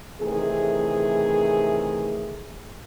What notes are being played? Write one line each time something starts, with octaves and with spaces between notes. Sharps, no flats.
C3 D#3 E3 A3 G#4